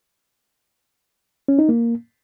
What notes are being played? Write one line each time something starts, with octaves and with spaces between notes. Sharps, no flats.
C#4
D#4
A#3